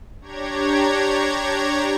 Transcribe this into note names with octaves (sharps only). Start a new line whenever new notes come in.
D4 G4 C#5 A#5 G#6